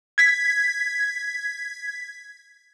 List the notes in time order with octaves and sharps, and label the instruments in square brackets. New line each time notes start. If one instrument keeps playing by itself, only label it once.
[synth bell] G#6 B6